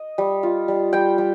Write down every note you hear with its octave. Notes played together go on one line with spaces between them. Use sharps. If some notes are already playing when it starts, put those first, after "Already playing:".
Already playing: D#5
G3
F4
G3
G3 G5
G3